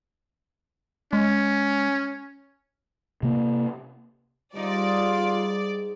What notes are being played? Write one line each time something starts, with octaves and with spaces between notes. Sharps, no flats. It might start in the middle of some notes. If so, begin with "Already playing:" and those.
G#3 C#4
C3 A#3
G#2 G3 D#4 F4 D5